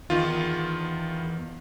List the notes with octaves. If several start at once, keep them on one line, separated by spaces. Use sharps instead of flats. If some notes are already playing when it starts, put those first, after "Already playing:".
E2 D#3 F4